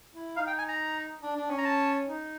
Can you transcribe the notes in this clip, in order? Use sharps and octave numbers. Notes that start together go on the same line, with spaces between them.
E4
D#4 F5
G5
G#5
A#5
D4
D4
C#4
A#5
A5
D#4